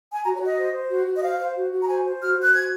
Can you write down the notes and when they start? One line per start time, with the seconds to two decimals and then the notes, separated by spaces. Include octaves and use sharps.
0.13 G#5
0.24 F#4 A#5
0.35 C#5
0.40 F#4
0.46 D#5
0.56 C5
0.73 C5
0.89 F#4
1.06 F#4
1.16 D#5
1.22 C5 F5
1.39 C5
1.55 F#4
1.72 F#4
1.82 A#5
1.88 C5 G#5
2.04 C5
2.21 F#4 F6
2.37 F#4
2.43 F#6
2.54 C5 G#6